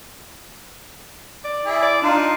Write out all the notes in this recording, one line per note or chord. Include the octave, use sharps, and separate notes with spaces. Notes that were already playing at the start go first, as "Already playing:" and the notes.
D5
E4 G#4
D5
D4 D#4 F4